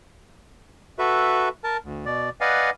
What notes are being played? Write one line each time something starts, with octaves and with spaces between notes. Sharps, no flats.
F#4 A4 B4 E5
A#4 A5
D2
B2 D5
B4 D5 D#5 F5 F#5 G#5